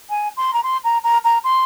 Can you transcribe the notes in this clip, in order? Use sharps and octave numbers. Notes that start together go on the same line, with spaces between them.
G#5
C6
A#5
C6
A#5
A#5
A#5
C6